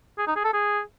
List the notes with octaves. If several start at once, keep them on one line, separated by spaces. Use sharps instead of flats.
G#4
D#4
G#4
A4
G#4